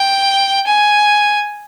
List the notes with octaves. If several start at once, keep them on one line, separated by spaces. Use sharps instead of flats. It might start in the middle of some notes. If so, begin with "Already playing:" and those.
Already playing: G5
G#5